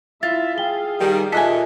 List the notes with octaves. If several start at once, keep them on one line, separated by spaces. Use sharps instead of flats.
E4 F4 E5 A6
G#4 F5 G5 G7
D#3 G3
A#2 A4 D#5 E5 G#5 F#6 B6